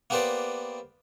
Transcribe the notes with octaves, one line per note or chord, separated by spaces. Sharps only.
A#3 B3 G4 B4 C5 D5